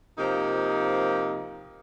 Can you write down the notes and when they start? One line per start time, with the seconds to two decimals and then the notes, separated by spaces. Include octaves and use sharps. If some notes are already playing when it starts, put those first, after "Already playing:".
0.18 C3 F3 A#3 D#4